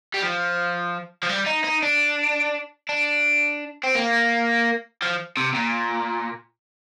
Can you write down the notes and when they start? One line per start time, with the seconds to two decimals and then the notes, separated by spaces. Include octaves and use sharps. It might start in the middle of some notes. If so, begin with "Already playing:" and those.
0.14 G3
0.22 F3
1.23 F3
1.29 G3
1.46 D#4
1.64 D#4
1.83 D4
2.89 D4
3.83 C4
3.95 A#3
5.02 F3
5.37 C3
5.55 A#2